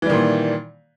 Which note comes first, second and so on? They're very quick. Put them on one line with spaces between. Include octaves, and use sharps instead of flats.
E3 G3 D#3 A#2